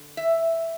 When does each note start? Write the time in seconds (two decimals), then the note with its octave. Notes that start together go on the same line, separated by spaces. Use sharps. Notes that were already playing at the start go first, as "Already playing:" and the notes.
Already playing: D3
0.17 E5